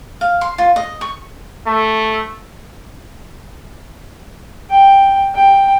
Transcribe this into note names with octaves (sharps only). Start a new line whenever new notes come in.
F5
C6
F4
D#5
C#6
A3
G5
G5